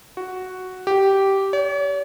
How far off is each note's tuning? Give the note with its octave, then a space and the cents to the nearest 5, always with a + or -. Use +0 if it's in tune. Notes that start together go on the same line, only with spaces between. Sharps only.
F#4 +0
G4 -10
C#5 +45